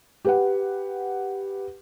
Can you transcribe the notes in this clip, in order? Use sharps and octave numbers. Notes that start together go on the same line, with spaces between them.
G4 B4 F#5